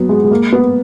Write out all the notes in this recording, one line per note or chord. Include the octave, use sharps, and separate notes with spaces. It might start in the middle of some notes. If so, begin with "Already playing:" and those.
Already playing: F#3 B3
G#3
G#3
A#3
B3